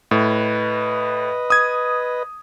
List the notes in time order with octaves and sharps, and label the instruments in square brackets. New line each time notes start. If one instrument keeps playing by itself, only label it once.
[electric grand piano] A2 [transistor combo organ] B4 D#5
[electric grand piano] D#6 G#6